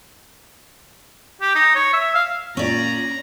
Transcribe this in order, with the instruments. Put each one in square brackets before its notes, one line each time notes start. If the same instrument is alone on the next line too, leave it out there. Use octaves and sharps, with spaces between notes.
[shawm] G4
D#4
C#5
E5
F5
[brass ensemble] A#2 [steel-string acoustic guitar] C#4 D5 [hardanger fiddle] A#5